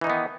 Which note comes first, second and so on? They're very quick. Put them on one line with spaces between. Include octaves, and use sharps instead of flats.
E3 D#4 D#3 B3